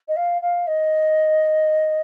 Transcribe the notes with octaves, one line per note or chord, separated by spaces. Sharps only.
D#5
F5
F5
D#5